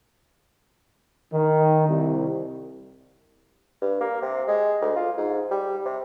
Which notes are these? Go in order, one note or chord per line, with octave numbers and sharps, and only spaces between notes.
D#3
C2
G2
A#3
C3
G#3
D2
F4
G#2
G3
C3